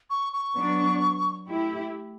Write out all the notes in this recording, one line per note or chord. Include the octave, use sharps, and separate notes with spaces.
C#6
C#6
F#3 B3 D4
A3 E4 G4